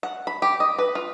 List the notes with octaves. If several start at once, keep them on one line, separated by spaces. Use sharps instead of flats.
F#5
B5
G4
D#5
B4
F4